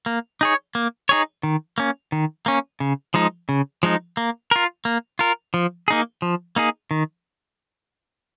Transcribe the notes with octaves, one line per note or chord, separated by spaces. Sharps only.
A#3
D#4 G#4 C#5
A#3
D#4 G#4 C#5
D#3
A#3 C#4
D#3
A#3 C#4
C#3
F3 G#3 D#4
C#3
F3 G#3 D#4
A#3
F4 A#4
A#3
F4 A#4
F3
A#3 D#4 G#4
F3
A#3 D#4 G#4
D#3